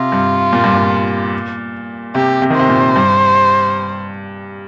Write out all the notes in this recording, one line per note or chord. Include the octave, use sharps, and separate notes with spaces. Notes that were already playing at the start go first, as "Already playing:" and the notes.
Already playing: C3 F4
G2
A#2
G2
A#2
C3 G4
C3
D#3
C3 C5
A#2
G2